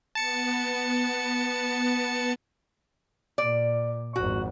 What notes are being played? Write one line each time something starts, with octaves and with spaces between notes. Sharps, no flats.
B3 A5 C#7
A#2 D5
G#1 F2 F#4